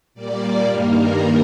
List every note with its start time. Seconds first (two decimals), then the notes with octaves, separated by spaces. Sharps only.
0.14 A#2 G3 A#3 D5
0.68 G2 D#3 G3 A#3 A#4